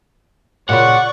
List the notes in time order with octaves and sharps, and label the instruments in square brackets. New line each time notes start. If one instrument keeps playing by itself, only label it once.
[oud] A#2 C#3 F4 [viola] D5 C#6 [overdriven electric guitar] F#5 [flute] F#6